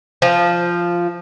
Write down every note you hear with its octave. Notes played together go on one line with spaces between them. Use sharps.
F3